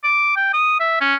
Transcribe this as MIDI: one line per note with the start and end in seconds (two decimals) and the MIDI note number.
0.04 0.33 86
0.36 0.51 79
0.53 0.80 87
0.80 0.98 76
1.01 1.15 61